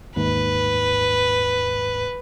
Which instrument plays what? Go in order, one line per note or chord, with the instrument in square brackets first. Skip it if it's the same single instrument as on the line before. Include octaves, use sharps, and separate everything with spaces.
[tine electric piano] D#2 G#2 [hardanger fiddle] B4